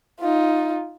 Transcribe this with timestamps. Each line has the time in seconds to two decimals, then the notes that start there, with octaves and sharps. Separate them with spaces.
0.20 D#4 F4